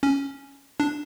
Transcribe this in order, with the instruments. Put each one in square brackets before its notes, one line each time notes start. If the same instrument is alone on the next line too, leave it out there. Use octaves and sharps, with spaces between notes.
[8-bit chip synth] C#4
D4